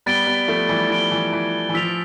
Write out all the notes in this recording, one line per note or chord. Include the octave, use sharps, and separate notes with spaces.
G3 B3 A6 D7 G7
G3 B3
F3 A3
E3 G3
F3 A6 D7 G7
E3
E3
E3
F3 E6 B6 F7